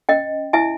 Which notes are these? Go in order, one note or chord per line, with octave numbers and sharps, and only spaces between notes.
C#4 D#5 G5
E4 E5 G#5